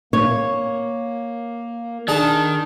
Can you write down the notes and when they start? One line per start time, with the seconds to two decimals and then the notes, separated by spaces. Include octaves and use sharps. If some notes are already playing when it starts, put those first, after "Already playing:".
0.13 A#3 C#5
2.08 D#3 D4 G#4 A5